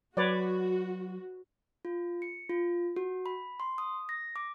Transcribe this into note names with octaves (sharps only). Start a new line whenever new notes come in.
F#3 F#4 B4 C#5 D5
F4
C#7
F4
F#4
B5
C6
D#6
A#6
D6